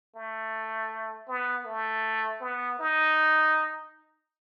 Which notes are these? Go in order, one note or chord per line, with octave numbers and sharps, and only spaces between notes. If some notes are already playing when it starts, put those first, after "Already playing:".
A3
B3
A3
B3
D#4